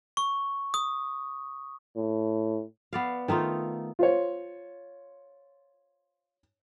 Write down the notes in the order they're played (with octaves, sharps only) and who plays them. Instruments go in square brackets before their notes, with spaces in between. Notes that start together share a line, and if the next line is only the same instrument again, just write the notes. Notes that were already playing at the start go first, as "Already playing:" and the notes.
[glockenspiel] C#6
D#6
[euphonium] A2
[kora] B3 D5 F5
D#3 A3 D#4 F4
[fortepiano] F4 C5 C#5